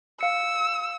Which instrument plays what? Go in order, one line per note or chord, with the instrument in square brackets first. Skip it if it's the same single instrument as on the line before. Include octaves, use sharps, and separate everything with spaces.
[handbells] F5 C#7 [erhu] E6